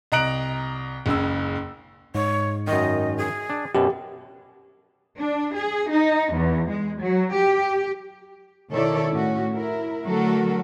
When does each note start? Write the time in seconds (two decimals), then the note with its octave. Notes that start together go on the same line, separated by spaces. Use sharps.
0.12 C2 D#5 A#5 F#6 D7 F#7
1.06 F#1 C#2 C#3 E6
2.15 G#2 C#5
2.67 F#2 D#3 D#5
3.17 G#4
3.50 D4
3.75 F#2 B2 G4
5.19 D4
5.55 G#4
5.91 D#4
6.33 E2
6.69 G#3
7.01 F#3
7.34 G4
8.72 B2 D#3 E4 A4 C#5 D5
9.11 A2 C#4 F#4
9.53 E4 A#4
10.06 D3 F#3 A3 F#4 A4 A#4